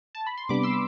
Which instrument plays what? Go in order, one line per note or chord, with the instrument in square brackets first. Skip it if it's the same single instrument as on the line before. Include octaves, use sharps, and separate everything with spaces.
[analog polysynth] A5
B5
C6
[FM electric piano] C3 G3 B3 D4 [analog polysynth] B5 D6
[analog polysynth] C6 E6